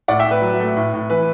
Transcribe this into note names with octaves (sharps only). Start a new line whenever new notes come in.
A2 D5 F#5
E5 G5
A2
B4
F#3
A3
A2
A2
E3 B4